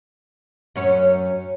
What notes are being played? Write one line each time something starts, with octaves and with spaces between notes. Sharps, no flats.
F#2 C#4 C#5